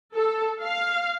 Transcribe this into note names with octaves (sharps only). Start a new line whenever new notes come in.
A4
F5